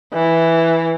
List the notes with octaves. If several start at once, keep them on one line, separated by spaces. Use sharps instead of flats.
E3